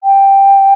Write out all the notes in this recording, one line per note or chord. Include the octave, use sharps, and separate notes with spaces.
G5